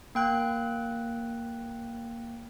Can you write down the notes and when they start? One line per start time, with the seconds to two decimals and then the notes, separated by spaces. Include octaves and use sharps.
0.15 A#3 G5 F#6